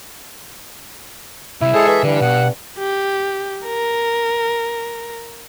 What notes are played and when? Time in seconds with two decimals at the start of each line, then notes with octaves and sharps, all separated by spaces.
1.61 C3 G3 E4
1.74 G#3 G#4 A4 C5 C#5
1.88 E3 E5
2.03 G2 D3 E3 G3
2.21 B2 F#5
2.78 G4
3.66 A#4